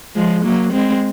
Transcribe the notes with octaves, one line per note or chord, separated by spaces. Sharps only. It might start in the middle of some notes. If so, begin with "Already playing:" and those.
F3 G#3
F#3 A#3
G#3 C4